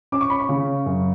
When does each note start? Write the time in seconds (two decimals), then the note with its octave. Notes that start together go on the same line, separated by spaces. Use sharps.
0.12 C#4 D6
0.21 C#6
0.30 B5
0.40 C#6
0.49 C#3
0.86 F#2